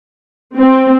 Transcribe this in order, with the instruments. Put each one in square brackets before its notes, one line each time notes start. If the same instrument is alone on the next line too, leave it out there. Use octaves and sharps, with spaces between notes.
[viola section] C4